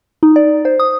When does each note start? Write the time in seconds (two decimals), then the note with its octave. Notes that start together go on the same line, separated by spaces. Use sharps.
0.23 D#4
0.36 D5
0.65 C5
0.80 D#6